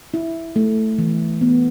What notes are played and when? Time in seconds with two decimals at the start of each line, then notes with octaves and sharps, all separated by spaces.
0.14 E4
0.56 A3
0.99 E3
1.41 B3